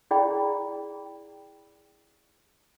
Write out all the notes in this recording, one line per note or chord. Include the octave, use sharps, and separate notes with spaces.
E4 G#4 D5 G5 B5